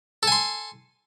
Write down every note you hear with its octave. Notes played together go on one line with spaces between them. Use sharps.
A4 G#5 C6